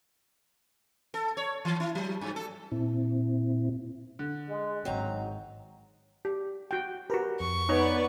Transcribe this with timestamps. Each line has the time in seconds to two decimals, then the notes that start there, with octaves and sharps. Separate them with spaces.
1.14 A4
1.37 C#5
1.65 E3
1.80 E4
1.95 F#3
2.21 G2
2.36 A4
2.72 A#2 C4 E4
4.19 D3
4.48 G#3
4.85 G#1 F#3 C4 D#4 A#5
6.25 G4
6.71 F#4 G5
7.10 F#4 G4 A#4 B4 A#5
7.40 F2 C#6
7.69 B3 D#4 C#5 D5